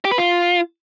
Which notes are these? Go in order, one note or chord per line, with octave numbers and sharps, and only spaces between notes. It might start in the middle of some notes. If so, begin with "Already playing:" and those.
G4
B4
F4